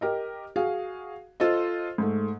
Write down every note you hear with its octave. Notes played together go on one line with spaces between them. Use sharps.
G4 A#4 D#5
F#4 G#4 F5
F4 A4 C5 D#5
G#2 A3